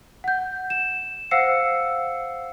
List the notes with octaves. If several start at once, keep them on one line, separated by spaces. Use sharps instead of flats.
F#5 G6
E7
C5 F5 F#5 E6 C7 C#7